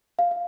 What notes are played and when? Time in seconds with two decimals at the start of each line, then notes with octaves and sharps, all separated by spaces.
0.19 F5
0.31 F5